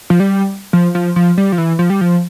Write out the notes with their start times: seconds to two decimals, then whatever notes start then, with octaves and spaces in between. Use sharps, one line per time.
0.10 F3
0.20 G3
0.73 F3
0.95 F3
1.16 F3
1.38 G3
1.52 F3
1.58 E3
1.79 F3
1.90 G3
2.01 F3